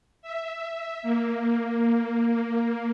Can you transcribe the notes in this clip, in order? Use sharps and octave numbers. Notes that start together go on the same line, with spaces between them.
E5
A#3